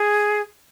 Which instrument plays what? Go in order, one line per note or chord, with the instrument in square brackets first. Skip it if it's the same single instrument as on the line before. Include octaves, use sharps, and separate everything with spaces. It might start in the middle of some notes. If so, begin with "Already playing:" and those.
Already playing: [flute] G#4